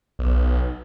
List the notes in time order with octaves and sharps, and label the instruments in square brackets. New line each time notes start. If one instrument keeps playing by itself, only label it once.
[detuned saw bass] B1